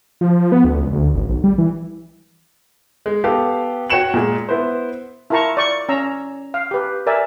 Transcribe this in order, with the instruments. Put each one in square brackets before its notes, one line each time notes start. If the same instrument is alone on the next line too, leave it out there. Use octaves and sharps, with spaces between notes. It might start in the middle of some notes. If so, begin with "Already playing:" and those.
[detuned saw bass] F3
B3
D2
C#2
D2
G#1
B1
G3
E3
[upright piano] G#3
B3 G4 A4 F5
F#4 C#5 G5 C#7 E7 F#7
A#2 G#3
B3 E4 B4 C5
[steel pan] E4 F4 A#4 A5 A#5 C#6
D5 C#6
C#4 A#5 E6
F5
G4 B4
A#4 D5 E5 G#5